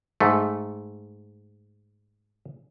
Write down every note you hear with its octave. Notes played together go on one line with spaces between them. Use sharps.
G#2 A3